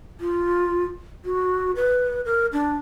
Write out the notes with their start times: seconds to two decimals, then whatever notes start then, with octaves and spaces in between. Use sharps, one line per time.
0.21 F4
1.25 F#4
1.76 B4
2.25 A#4
2.52 D4